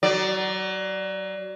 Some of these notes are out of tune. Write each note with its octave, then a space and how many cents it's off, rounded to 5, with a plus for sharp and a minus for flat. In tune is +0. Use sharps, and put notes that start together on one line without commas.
F#3 +25 D5 +0